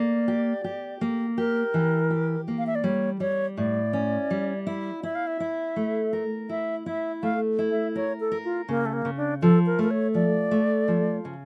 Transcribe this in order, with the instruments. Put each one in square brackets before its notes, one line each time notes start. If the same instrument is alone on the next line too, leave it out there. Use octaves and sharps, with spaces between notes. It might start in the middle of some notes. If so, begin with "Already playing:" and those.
Already playing: [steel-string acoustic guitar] A#3 [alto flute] D5
[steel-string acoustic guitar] G4
G4
A#3
[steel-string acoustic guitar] G4 [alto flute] A#4
[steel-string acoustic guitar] E3
G4
A#3
[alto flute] F5
E5
D5
[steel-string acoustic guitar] G3 [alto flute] C#5
[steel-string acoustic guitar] G3 [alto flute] C#5
[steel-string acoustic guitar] A2 [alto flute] D5
[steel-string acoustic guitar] C#4
G3
E4
[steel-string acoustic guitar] E4 [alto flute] E5
[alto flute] F5
E5
[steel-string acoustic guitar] E4
A3
A#4
[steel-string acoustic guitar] E4 [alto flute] E5
[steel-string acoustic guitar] E4 [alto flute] E5
[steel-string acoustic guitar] A3 [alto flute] F5
[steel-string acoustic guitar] E4
[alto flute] E5
[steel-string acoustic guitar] A#4 [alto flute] C#5
[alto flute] A4
[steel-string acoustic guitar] A#4
[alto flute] F4
[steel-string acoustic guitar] C#3 [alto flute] A#3
[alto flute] A3
A#3
[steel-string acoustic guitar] C#3
[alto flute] D4
[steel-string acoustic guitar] F3 [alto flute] A4
[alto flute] A#4
[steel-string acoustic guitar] A3 [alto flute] A#4
[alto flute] C#5
[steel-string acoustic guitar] F3 [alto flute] D5
[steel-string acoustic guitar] A3
F3
C#3